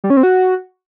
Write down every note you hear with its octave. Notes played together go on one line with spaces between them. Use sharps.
G3
C#4
C4
F#4